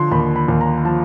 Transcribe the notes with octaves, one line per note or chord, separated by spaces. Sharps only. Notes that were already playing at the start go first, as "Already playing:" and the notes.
Already playing: D3 F3 C6
D#2 B5
B5
D#2
A#5
F3 A5